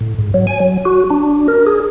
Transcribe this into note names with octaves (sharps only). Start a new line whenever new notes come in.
A2
G#2
F#3
G#5
F#3
F#4
D4
A#4
G#4